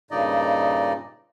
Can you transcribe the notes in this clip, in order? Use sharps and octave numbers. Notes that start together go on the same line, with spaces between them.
G2 A#2 C#3 D#4 D5 D#5